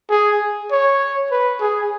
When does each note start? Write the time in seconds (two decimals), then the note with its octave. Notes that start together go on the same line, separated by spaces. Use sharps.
0.10 G#4
0.71 C#5
1.32 B4
1.61 G#4